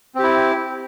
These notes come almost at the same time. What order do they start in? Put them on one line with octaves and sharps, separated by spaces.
C4 G4 E4